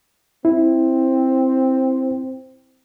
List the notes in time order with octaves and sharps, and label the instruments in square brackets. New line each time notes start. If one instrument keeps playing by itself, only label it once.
[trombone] C4 [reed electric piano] E4